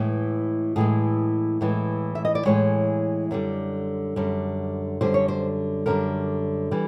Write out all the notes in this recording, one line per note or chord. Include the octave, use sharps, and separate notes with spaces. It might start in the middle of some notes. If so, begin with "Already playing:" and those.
Already playing: A2 E3 G#3
A2 E3 G#3 G#4
A2 E3 G#3
E5
D#5
D5
A2 E3 G#3 C#5
F#2 D3 G3
F#2 D3 G3
F#2 D3 G3 C5
C#5
C5
F#2 D3 G3 A#4
E3 G3